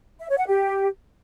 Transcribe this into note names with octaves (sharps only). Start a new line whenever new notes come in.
E5
C#5
F#5
G4